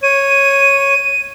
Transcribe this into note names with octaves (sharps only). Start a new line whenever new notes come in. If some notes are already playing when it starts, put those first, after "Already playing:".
C#5 D#7